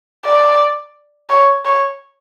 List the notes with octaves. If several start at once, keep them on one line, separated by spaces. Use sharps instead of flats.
D5
C#5
C#5